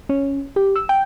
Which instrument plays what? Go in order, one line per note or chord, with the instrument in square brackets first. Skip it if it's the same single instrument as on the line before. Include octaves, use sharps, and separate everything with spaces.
[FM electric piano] C#4
G4
E6
G5